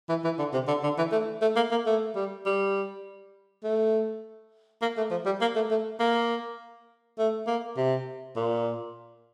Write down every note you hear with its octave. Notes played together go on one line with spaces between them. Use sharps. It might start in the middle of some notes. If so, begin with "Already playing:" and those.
E3
E3
D3
C3
D3
D3
E3
A3
A3
A#3
A#3
A3
G3
G3
A3
A#3
A3
F3
G3
A#3
A3
A3
A#3
A3
A#3
C3
A#2